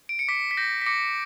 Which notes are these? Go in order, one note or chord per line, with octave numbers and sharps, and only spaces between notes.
D7
C#7
D6 B6
B6
G6 A#6
B6
D6 A#6 C#7